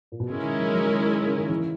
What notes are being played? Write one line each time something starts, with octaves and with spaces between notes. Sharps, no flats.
A#2
B2
C#3 G#3 C#4 E4 A#4
D#3
F#3
F#3
D#3
C#3
D#3
E3